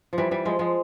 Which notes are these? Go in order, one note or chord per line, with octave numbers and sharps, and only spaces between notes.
F3
E3 G3
E3 G3
F3 G#3
F3 G#3